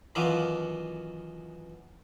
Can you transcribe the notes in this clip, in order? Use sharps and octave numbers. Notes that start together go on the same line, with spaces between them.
F#2 B2 D#3 E3 F4 D6